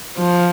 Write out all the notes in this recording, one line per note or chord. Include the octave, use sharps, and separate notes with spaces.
F3